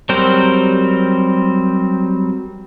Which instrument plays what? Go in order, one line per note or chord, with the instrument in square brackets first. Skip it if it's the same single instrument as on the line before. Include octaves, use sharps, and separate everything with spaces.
[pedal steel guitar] F#3 G3 C4 A#4 C5